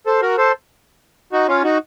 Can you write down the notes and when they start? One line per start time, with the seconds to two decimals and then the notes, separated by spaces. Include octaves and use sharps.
0.07 A4 C5
0.22 F#4 A#4
0.38 A4 C5
1.33 D#4 F#4
1.48 C#4 F4
1.64 D#4 F#4